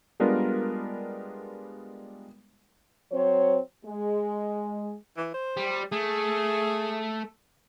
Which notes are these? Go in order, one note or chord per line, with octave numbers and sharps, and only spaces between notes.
G3 G#3 B3 D4 F4 A#4
F#3 C4 C5 C#5
G#3
E3
C5
G3
A3 G#4